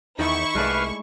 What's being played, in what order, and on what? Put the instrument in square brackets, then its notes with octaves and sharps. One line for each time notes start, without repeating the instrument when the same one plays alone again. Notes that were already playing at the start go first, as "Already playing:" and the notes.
[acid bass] E2 [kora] D#3 D#5 G5 [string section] E4 C#6
[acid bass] C2 [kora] G#3 A3 D5 [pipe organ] B4 F5 F6